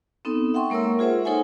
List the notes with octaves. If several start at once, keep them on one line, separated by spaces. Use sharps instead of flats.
B3 C4 D#4 A4
E5 F#5 G5 C6 C#6
G#3 A#3 A#4 C#5 E6
F4 G#4 C5 E5 F#5
D#4 A4 C5 C#5 F#5 G#5